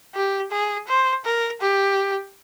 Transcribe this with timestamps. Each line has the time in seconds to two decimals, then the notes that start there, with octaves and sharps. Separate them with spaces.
0.15 G4
0.52 G#4
0.88 C5
1.25 A#4
1.61 G4